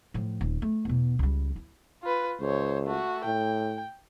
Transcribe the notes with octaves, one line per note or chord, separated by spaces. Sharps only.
A2 F3
D#1
A3
E2 B2
C#2 G3
E4
F4 B4
C#2 C5 C#5
A3 F#4
A2 G5